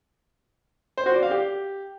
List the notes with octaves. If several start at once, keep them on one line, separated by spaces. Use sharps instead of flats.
C5
F#4
D5
F5
G4